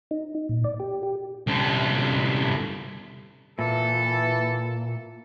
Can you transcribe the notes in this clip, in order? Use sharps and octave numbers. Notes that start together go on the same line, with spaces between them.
D#4
A#2
D5
G4
G4
C2 D3
A#2 E3 A4